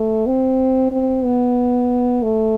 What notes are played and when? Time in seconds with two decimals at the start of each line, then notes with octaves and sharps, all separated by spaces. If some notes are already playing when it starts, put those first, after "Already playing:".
Already playing: A3
0.27 C4
0.91 C4
1.24 B3
2.23 A3